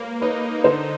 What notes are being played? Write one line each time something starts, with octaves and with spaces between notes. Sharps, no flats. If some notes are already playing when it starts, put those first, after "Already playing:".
Already playing: A#3 B4 C#5
D#4 B4 C#5
D3 A#4 C5